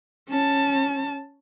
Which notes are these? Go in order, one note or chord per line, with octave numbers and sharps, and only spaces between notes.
C#4 A5